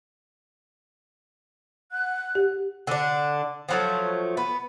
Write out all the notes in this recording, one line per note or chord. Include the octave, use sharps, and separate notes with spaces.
F#5 F#6
G4
D3 D4
F3 F#3 A3
B3